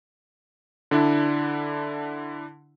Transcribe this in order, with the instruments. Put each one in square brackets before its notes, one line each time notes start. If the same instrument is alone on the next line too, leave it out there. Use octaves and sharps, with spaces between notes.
[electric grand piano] D3 D4 E4